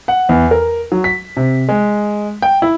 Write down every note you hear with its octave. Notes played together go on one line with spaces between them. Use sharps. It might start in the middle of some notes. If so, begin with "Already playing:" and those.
F#5
E2
A#4
F#3
B6
C3
G#3
G5
E4